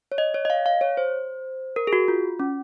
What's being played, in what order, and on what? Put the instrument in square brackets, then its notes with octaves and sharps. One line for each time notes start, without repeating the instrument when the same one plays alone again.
[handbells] C#5
D#5
C#5
D#5
F5
F5
C#5
C5
A#4
G#4
F#4
F4
C#4